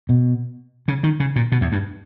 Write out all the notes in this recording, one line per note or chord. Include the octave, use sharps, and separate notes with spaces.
B2
C#3
D#3
C#3
A#2
B2
E2
G2